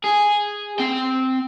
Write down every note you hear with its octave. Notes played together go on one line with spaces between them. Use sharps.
G#4
C4 G5